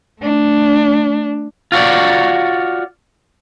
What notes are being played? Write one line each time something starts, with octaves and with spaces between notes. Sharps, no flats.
A3 D4
F4 F#4 C#5 D5